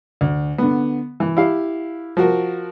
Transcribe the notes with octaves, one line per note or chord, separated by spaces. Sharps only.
D2
D3 B3
E3
E4 G4 F5
F3 F#4 A#4